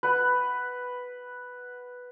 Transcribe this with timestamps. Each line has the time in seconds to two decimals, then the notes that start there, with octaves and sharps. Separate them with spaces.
0.03 B4 F#5